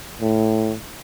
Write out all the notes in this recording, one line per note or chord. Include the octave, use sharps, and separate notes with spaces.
A2